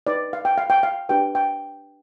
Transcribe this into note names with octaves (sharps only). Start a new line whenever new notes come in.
D#4 B4 D5
F5
G5
F5
G5
F5
D4 G4 B4 G5
G5